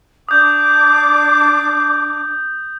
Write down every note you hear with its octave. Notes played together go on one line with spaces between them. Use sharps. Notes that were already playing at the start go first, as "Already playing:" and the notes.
D4 D6 D#6 G6